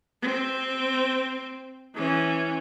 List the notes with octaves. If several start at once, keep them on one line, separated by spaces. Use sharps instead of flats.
C4
E3 C#4